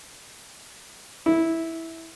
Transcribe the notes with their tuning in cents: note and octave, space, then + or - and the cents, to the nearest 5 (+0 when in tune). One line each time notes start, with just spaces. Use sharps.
E4 -10